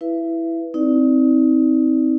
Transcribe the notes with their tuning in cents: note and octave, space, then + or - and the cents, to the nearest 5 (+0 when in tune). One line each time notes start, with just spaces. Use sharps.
E4 +0 B4 +0 E5 +30
C4 +0 D#4 +30 D5 +0